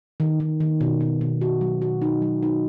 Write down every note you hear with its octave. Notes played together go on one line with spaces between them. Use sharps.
D#3
D#3
D#3
B2
B2
B2
F#4
F#3
F#4
D#4
F#3
D#4